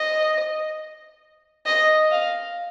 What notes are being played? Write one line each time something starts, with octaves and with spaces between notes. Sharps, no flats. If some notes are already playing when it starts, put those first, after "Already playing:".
Already playing: D#5
D#5
F5